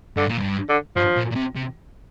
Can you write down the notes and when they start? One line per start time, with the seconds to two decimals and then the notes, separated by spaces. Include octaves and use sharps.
0.17 G2 D3
0.28 A#2
0.38 G2
0.69 D3
0.96 G2 F3
1.17 A#2
1.31 A#2
1.36 C3
1.55 C3